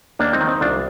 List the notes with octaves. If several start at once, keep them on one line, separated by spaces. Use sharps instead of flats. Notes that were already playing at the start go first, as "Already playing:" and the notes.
D#2 A#3 D4
C4 D#4
D#3
C4 D#4
C2 D4 F4